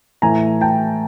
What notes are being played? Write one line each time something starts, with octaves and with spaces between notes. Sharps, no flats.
A2 E3 G#5 A#5
G5 A5